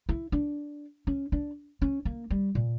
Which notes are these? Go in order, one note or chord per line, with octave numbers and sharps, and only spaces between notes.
E4
D4
C#4
D4
C#4
A#3
G3
A#2